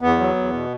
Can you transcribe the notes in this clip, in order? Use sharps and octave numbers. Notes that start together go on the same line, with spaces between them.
E2 B3
F#3
E2
B2